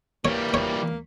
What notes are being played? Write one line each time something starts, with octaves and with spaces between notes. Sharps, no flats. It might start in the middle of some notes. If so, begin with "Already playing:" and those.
E3 G3 A#3 C#5
C#5